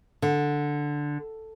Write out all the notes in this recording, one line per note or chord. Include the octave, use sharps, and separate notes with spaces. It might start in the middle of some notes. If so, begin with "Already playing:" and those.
D3